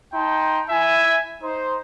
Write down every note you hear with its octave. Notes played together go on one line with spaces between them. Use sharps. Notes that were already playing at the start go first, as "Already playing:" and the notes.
D#4 G5 A5 C6
E4 E5 G#5
D#4 C5